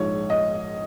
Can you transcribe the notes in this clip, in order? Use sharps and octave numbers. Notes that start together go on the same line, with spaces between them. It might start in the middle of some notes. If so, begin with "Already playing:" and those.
Already playing: A#1 G#2 F3 G#3 C#5
D#5